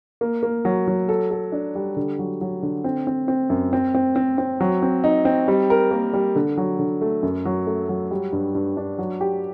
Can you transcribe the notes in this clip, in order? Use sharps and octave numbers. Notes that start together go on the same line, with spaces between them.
A#3
A#3
F#3
F#3
A4
A4
D4
G3
D3
F#3
F#3
D3
C4
C4
C4
F#2
C4
C4
C4
C4
F#3
C4
D#4
C4
G3
A#4
A#3
G3
D3
F#3
D3
A3
F#2
F#3
A3
F#3
G3
G2
G2
D4
F#3
G4